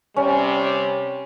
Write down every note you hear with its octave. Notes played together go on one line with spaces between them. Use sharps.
C3 G3 C#4